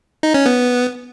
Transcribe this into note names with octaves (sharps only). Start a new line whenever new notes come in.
D#4
C#4
B3